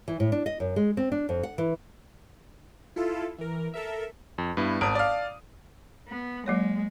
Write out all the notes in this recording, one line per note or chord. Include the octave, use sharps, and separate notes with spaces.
E3
A2
D4
D#5
F#2
G#3
C4
D4
F2
F#5
E3
E4 F4 A4
E3 A#4
A4 A#4 E5
F2
G2 B3 E4
G#1 A5 D#6 D7
D5 F5
B3
F#3 G#3 A#3 C#5